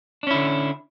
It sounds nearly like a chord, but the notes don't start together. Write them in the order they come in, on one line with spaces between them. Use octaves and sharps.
D4 C#4 E4 D3